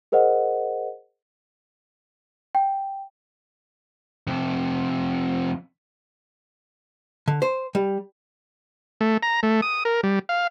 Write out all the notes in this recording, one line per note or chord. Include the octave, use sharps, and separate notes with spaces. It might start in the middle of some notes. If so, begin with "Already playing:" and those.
G#4 A#4 C5 D#5 F#5
G5
F2 C3
D3
C5
G3
A3
A#5
A3
D#6
A#4
G3
F5